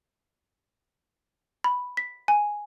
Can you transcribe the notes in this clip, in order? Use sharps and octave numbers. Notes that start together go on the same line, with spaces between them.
B5
B6
G#5